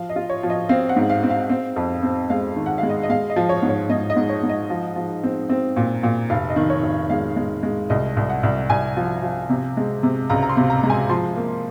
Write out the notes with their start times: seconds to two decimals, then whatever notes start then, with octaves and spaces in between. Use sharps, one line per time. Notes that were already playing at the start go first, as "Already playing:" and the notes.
Already playing: F3 F5
0.09 D#5
0.16 F4
0.30 C#5
0.43 F3
0.50 D#5
0.69 C4 F5
0.89 F#5
0.96 G#2
1.09 F5
1.23 C4
1.30 F5
1.50 C4
1.76 F2
2.03 C4
2.30 G#3 F5
2.56 D#3
2.66 F#5
2.78 G#3 F5
2.90 D#5
3.03 D#5
3.10 G#3 F5
3.30 D#5
3.36 F3
3.49 C#5
3.62 G#2
3.69 C#5
3.90 G#2 D#5
4.10 D#5
4.16 G#2
4.29 C#5
4.43 G#2
4.49 D#5
4.70 F3
4.96 F3
5.23 C4
5.50 C4
5.77 A#2
6.03 A#2
6.30 F1 F5
6.50 D#5
6.56 D#3
6.70 C#5
6.83 F1
7.10 G#3 F5
7.36 G#3
7.63 G#3
7.90 C2 D#5
8.17 C2
8.30 F#5
8.43 C2
8.70 C2 G#5
8.97 F3
9.23 F3
9.50 C3
9.77 G#3
10.03 C3
10.30 C#2 A#5
10.43 A#5
10.49 C6
10.57 C3
10.70 A#5
10.83 G#3
10.90 G#5
11.10 F3 C6
11.36 A#3